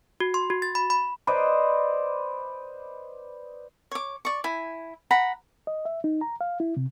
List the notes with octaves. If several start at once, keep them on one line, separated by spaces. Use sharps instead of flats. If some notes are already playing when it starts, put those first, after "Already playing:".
F#4
C6
F#4
A6
B5
B5
B4 C5 D5 D#5
C#5 D6
D5 C#6
E4 G#5
F#5 A#5 B5
D#5
E5
D#4
A#5
F5
E4
C3